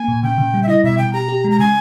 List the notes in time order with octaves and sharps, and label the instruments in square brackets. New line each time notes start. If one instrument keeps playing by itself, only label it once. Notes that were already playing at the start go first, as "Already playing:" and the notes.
Already playing: [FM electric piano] A#3 [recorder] G#5
[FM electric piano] A#2
[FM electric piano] C#3 [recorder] G5
[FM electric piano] C#3
G3
[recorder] E5
[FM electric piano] E4 [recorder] D#5
[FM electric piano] B2 [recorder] E5
[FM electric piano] B2 [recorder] G5
[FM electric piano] G4 [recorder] A#5
[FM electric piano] G4
G#3
[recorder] A#5
[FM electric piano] C#3 [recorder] G#5